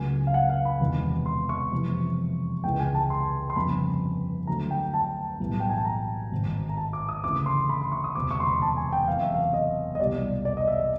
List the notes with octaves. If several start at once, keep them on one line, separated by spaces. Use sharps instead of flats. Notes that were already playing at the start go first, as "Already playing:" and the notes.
Already playing: C#2 C#3 F#3 A3 G#5
F5
F#5
F5
B5
E1 E2 C3 D#3
C6
C#6
F2 C3 E3
C#2 C3 E3 G#3 G5
G#5
A5
C6
C6
G1 F2 C#3 B5
D2 D3 F#3 A3 A#5
G5
A5
B1 A2 E3 G3
G5
G#5
A5
A#5
G#1 G#2 D#3
A#5
A5
D6
D#6
D2 C#3 E3 A3 D6
C6
B5
C6
C#6
D#6
E1 D2 C3 D6
C#6
C6
B5
A5
G#5
G5
F#1 E2 C3 F5
E5
F5
D#5
D#5
C2 B2 G3 D5
D5
D#5
E5
D#5